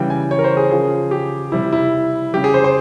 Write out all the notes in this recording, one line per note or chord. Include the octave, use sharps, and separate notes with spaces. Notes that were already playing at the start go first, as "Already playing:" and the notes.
Already playing: C#3 E3 G3 G5
G#5
C#5
A#4
C5
G#4
C#3 F3 G#4
G4
C3 G3 E4
E4
C#3 G3 G4
G#4
C5
C5